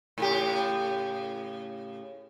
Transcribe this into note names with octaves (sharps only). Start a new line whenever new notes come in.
A2 C#3 G4